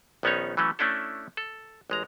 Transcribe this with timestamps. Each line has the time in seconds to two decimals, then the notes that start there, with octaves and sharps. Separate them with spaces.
0.23 A#1 D#3 B3 C#4 D#4 C#5
0.57 E3 F#3 A3 C#4
0.79 A3 C#4 D4 E4 A4
1.37 A4
1.90 A1 G#3 A#5